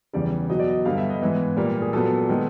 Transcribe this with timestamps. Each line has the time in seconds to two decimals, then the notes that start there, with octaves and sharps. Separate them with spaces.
0.13 E2 C#3 E3 G3 D5
0.49 B2 F#3 B3 D#5
0.59 D5
0.69 D#5
0.85 G2 D3 G3 B3 F5
0.98 E5
1.10 D#5
1.22 G#2 E3 G#3 B3 B4
1.56 A#2 G3 A#3
1.82 G#4
1.93 A#2 F#3 B3 A4
2.29 D#3 G#3 B3